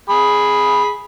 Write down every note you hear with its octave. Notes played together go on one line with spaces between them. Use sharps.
G#4 B5